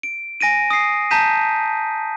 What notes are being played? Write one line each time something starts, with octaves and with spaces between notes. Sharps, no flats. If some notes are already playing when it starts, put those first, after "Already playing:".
D7
G#5 A#6 D7 D#7
D#6 C7
A5 A#5 G6 B6 D#7